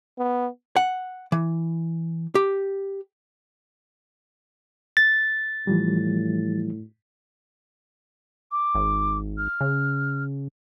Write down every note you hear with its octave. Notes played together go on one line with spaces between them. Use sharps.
B3
F#5
E3
G4
A6
A2 E3 F3 G3
D6
G#1
F6
C#3